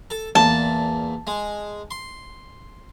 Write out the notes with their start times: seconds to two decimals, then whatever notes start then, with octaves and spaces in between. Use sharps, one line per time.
0.10 A4
0.35 E2 A#2 A5
1.27 G#3
1.91 C6